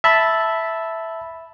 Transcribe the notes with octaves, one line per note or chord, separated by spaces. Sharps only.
E5 A5 B5